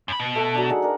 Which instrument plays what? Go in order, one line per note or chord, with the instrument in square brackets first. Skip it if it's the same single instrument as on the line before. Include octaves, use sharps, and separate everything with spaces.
[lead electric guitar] F#2 B5
B2
[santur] A3 A4
F#3 D4
D#4 G#4 F#5
D4 A#4